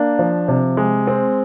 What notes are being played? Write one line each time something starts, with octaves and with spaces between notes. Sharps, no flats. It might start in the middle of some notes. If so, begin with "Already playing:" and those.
Already playing: A#3 D4
F3
C3
G#3
C4